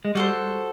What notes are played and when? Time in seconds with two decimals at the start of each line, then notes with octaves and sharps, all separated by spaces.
0.05 G#3
0.15 G3 F#4 A4 C5